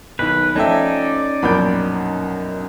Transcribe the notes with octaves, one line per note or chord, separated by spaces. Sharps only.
B1 D#3 B4
F3 A3 C#4 D#4 D5 E5 G5 A5
A#1 F#2 B2 B5 D6 G6